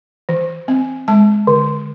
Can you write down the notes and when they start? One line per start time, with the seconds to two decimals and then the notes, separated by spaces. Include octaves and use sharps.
0.29 E3
0.68 C4
1.08 G#3 A5
1.47 D3